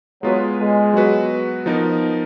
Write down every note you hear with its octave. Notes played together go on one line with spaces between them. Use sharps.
F#3 G#3 B3 F4 B4
G#3
F#3 B3 F#4 B4
F3 B3 D#4 A#4